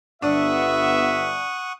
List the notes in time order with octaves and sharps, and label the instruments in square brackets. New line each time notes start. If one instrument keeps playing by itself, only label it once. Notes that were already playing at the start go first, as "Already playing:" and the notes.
[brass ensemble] G1 B3 E5 [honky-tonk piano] D4 [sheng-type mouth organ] F#5 C#6 D#6